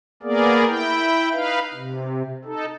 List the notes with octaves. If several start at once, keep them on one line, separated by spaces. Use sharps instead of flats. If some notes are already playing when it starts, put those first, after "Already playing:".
A#3 B3 G#4 A#4 D5
E4 G5
D#4 B4 F5
C3
D#4 A4